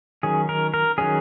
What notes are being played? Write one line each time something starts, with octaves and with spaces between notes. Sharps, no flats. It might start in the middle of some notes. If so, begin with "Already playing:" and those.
D#3 F#3 C#4 G#4
A#4
A#4
D#3 F#3 C#4 G#4